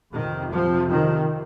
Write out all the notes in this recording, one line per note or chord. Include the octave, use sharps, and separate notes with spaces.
F2 C3 D#3
F3
D#3